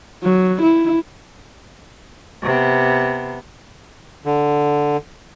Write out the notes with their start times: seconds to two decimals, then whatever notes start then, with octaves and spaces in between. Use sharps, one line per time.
0.23 F#3
0.62 E4
2.43 C3 B3
4.25 D3